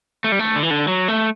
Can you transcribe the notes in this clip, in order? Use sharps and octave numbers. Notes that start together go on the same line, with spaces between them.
A3
G3
A3
D3
E3
D3
F#3
A3